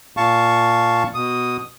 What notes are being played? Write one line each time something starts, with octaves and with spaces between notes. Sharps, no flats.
A#2 F5 A5 C#6
B2 D#6